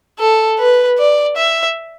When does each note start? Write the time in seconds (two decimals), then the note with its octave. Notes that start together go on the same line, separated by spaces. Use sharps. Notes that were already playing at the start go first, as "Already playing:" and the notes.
0.19 A4
0.59 B4
0.98 D5
1.37 E5